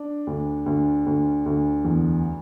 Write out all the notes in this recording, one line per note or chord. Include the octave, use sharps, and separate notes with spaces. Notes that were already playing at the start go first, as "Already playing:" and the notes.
Already playing: D4
D2
D2
D2
D2
E2